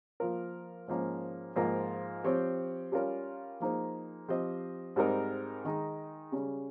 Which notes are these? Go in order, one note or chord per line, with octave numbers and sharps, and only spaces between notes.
F3 A#3 F4 A#4
G#2 F3 A#3 C#4
G#2 F3 A#3 F4 A#4
F3 C4 G4 C#5
G3 C#4 F4 A#4 C#5
F3 A#3 D#4 G#4 C5
F3 C4 G4 C5 D#5
G#2 G3 C4 D#4 A#4
D#3 G#3 D#4
C#3 G3 C#4